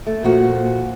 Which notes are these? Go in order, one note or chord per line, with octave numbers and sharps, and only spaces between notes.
A3
A#2 F3 F#4